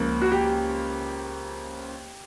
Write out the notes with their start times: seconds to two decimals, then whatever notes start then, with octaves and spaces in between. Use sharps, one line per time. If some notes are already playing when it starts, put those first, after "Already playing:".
Already playing: C#2 C#3 F3 A#3
0.22 F#4
0.32 G4